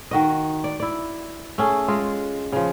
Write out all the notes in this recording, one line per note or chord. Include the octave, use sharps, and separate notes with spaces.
D#3 F#4 D#5
D5
E4 D5
A3 C#4 G#4
G#3 F4 G#4
C#3 F3